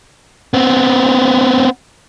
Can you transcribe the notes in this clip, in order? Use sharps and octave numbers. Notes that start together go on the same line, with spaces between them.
B3 C4